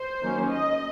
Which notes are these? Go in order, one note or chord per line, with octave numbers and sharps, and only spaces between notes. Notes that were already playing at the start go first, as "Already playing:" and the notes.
Already playing: C5
D#3 F#3 A#3 C#4
D#5